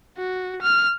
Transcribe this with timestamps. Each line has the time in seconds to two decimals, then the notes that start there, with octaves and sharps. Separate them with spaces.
0.17 F#4
0.62 F6